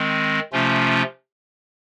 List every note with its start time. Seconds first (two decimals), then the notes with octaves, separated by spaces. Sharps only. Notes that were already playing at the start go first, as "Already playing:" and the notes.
Already playing: D#3 G#3 C4
0.53 C3 F3 A3 C#4 F4